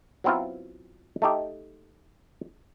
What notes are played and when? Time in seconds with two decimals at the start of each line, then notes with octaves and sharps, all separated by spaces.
0.24 F#3 B3 C4 E4 F4
1.22 A3 D#4 G4